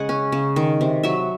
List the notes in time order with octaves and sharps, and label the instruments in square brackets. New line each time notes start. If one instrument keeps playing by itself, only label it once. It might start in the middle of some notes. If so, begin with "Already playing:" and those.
Already playing: [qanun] C#3 G#3 F#5 G#5
C#4
C#3
D#3
C3
F#3 E5